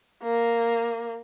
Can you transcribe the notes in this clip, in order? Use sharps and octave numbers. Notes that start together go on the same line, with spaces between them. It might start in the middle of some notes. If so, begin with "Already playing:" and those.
A#3